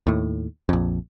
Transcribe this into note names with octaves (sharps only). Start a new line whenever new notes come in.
D#2 A2
A#1 F2